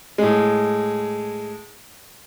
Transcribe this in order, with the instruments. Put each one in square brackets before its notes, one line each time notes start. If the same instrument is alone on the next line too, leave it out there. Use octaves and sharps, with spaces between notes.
[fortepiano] A2 G#3